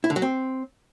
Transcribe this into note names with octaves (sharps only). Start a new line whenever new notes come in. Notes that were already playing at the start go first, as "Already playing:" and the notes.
E4
D3
F#3
C4